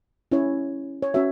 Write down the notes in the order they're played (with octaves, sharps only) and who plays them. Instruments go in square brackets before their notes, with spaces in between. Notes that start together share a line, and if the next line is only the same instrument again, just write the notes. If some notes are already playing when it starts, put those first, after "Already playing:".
[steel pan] C#4 E4 C#5
C#5
C#4 F#4 C#5 E5